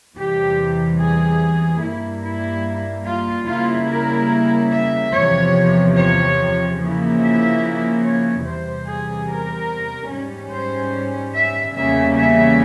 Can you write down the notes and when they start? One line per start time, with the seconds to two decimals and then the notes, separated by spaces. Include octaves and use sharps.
0.15 E2 C3 E3 G3 G4
0.98 G#4
1.81 G2 G3 A#3 E4
2.23 E4
3.05 F4
3.47 C#3 G3 A#3 E4 F4
3.89 A#4
4.71 E5
5.13 E2 C3 F3 C#5
5.95 C#5
6.78 C#3 F3 A#3 E4
7.20 E5
8.03 C#5
8.44 E2 C3 G3 C5
8.86 G#4
9.27 A#4
10.10 G#2 G3 C#4
10.51 C5
11.34 E5
11.75 E2 C#3 G3 A#3 C#4 E5
12.16 E5